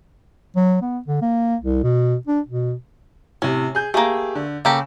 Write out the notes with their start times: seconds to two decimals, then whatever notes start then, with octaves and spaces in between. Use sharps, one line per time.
0.56 F#3
0.81 B3
1.07 D3
1.22 A#3
1.62 C2
1.83 B2
2.27 D4
2.48 B2
3.42 A2 C3 C#4
3.75 G#4 G6
3.94 A3 A#3 G4 G#4
4.35 D3
4.65 C#3 A#3 G4 A4